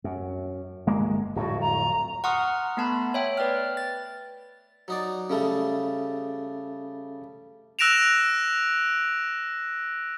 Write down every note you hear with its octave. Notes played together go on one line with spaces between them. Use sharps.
F#2
G1 G#3 A#3
D1 F2 A2 F#4
A#5
F#5 A#5 C6 C#6 D#6 F6
A3 B3 A5 B5
C#5 E5 G5
B4 D5 G5 F6
A6
F#3 D#4 D5
C#3 G3 A3 C#4 A4 E5
E6 F#6 A#6 D7 E7 F7